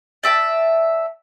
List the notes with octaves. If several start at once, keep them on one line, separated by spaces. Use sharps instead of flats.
D5 E5 G5 A5